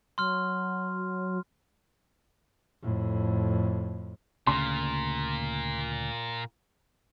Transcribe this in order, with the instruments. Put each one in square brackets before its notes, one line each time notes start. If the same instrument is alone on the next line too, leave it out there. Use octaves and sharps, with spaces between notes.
[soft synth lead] F#3 [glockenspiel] C6 F6
[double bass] F2 A2
[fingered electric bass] D2 C#3 [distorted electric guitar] A#2 [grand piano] C6